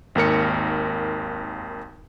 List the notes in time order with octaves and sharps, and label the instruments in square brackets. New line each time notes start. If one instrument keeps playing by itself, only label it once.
[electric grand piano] G#1 D#2 A#4 C#7